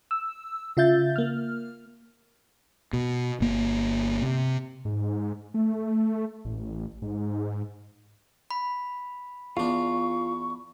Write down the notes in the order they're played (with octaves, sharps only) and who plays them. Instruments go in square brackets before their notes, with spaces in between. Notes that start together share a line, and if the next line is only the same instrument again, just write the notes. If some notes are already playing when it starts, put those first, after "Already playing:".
[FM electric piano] E6
C#3 F4 E5 G6 A6
A#3 F6
[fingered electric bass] B2
G1 A#3
C3
[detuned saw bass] G#2
A3
A1
G#2
[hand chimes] B5
[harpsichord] E2 D4 [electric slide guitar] F4 [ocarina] C#6